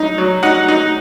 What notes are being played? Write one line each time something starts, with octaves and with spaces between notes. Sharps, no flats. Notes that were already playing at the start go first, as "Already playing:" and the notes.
Already playing: F#3 D#4
F#3
D#4 F#5
D#4